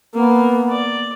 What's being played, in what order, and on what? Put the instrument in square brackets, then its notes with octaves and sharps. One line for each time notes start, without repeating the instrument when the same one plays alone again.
[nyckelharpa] A#3 [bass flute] B3
[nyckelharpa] D5